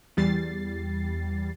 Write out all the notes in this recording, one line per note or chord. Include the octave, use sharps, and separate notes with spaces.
E2 G3 A6 C7